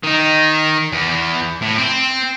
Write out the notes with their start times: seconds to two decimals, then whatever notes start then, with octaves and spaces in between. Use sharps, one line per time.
0.03 D#3 D#4
0.92 E2
1.62 A2
1.78 C4